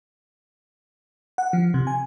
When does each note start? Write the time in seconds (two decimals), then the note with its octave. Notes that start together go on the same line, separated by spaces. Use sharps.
1.38 F#5
1.53 F3
1.74 C3
1.87 G#5